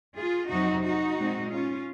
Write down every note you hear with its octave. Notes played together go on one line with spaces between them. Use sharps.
F4 G#4
F2 C3 F#3 C4 D#4 F#4
D#4 F#4
A#2 G#3 C4
C#4 F4